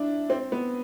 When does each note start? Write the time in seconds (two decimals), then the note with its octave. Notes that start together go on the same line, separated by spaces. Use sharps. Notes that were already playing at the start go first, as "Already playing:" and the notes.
Already playing: D4 E4
0.30 C4
0.52 B3